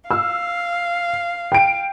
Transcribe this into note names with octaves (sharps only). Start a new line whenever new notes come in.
F5 E6 F6
G5 D7